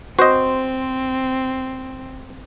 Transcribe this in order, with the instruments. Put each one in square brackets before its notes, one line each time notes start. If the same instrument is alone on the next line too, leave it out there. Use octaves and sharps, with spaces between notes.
[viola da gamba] C4 [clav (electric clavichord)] F#4 D#5 [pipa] C5